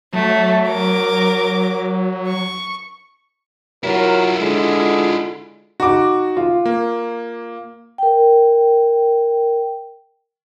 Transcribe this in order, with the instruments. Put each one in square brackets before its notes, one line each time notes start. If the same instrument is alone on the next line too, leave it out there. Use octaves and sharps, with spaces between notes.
[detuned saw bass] F#3 [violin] A3
[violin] A#4 D6
C#6
[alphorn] F#3 [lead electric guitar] E4 F4 [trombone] A#4
[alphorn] D3 [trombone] G#3
[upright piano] D#4 D6 [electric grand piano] F#4
[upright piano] F4
[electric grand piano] A#3
[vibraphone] A#4 G5